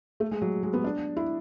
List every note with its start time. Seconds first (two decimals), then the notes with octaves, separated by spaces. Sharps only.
0.20 A3
0.31 G#3
0.42 F#3
0.63 G#3
0.74 B3
0.84 D4
1.17 E4